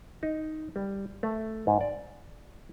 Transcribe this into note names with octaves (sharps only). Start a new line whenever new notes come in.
D#4
G3
A3
G#2
D5